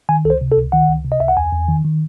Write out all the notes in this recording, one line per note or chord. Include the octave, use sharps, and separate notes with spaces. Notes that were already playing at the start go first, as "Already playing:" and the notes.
D#3 G#5
C#2 A4
C5
C3
A4
C#2
D#3 F#5
C#2
C3
D#5
C#2 E5
F#5
E2 G#5
E2
D#3
D#3